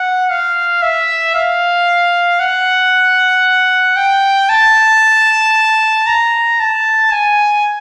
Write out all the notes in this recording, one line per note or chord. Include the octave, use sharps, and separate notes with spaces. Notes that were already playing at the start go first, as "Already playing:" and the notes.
Already playing: F#5
F5
E5
F5
F#5
G5
A5
A#5
A5
G#5